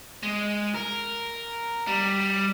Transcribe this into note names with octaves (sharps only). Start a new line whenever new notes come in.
G#3
A#4
G3